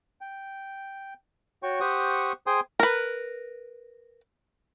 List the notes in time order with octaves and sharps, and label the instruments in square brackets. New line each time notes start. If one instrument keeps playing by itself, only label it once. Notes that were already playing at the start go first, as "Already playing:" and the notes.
[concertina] G5
F#4 C#5 G5 C#6
G4 C5 F#5 C#6 D#6
G#4 C5 G5 G#5 C6 D#6
[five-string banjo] A#4 B4